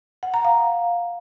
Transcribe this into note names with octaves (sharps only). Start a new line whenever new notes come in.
F#5
A#5
F5